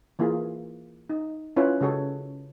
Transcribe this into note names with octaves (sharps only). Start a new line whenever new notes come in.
E3 A#3 E4 F4 G#4
D#4
C#4 E4 F4 B4 C#5
C#3 G#3 F#4 A4 C#5